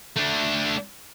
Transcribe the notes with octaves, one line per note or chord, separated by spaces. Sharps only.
A3 D4